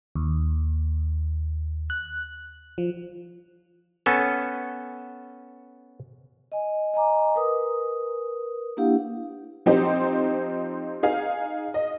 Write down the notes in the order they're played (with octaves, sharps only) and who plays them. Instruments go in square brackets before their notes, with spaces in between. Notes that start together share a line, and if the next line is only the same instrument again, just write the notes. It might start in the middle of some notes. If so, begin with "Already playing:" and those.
[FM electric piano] D#2
F#6
F3
[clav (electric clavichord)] B3 C#4 A4
[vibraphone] D#5 G#5
D#5 G#5 A#5 D6
A#4 B4 D#6
A#3 D4 E4 G4 F5 F#5
[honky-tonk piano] F3 C4 D#4 G4 C5
D#4 G#4 F5
D#5